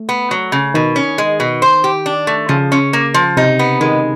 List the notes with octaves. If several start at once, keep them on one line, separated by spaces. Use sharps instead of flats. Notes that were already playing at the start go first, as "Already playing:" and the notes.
Already playing: A3
B3
F#3
C#3
B2 D#3
C#4
G#3
B2
C5
G4
D4
A3
C#3 F3
C#4
A#3
F3
C3 D#4
B3
D#3 G#3